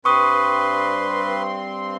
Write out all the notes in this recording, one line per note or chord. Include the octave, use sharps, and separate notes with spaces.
G2 C4 B4 C6 C#6 D#6